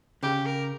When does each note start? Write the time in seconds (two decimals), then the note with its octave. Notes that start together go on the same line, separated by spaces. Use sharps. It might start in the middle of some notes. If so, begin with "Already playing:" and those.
0.23 C#3 G4
0.45 A#4